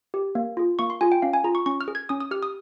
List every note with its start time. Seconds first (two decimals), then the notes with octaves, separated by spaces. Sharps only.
0.14 G4
0.35 A#3
0.57 F4 G#4
0.79 A#3 C#6
0.90 C6
1.01 F4 G#4 G#5
1.12 G5
1.22 C#4 F5
1.33 G#5
1.44 F4 G#4 A#5
1.55 C#6
1.66 C#4 C#6
1.81 F6
1.88 G#4
1.95 G#6
2.09 C#4 D#6
2.20 D#6
2.31 G4 F6
2.43 D#6